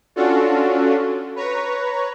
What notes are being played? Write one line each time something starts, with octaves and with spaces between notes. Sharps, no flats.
C#4 D4 F4 F#4 A4
B4 C#5 A#5